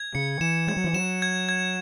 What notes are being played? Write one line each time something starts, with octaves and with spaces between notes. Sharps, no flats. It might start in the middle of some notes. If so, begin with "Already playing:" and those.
Already playing: G#6
C#3 C#7
E3 E7
G#3 G#6
F#3
E3
F#3 E7
G#6
G#6